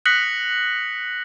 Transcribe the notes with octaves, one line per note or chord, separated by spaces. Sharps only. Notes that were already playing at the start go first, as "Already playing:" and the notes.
D#6 F#6 A#6 B6 C#7 F#7